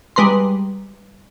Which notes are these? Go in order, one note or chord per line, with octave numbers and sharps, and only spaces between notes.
G3 G#3 B4 A#5 C6